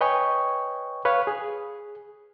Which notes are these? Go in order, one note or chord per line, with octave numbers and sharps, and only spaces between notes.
B4 C#5 D#5 G5 G#5 C#6
B4 C#5 F5
G#4